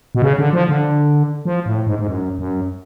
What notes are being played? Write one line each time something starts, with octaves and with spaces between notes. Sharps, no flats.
B2
C#3
D3
F3
D3
F3
A2
G#2
G#2
F#2
F#2